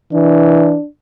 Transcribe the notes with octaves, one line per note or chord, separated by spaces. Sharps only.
E3 D4